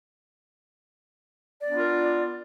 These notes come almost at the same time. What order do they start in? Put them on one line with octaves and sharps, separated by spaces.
D5 B3 D4 F4 A#4